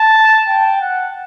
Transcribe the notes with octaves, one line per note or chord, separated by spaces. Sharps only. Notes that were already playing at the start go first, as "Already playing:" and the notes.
Already playing: A5
G5
F#5